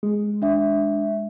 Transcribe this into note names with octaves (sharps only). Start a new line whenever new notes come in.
G#3
D4 E5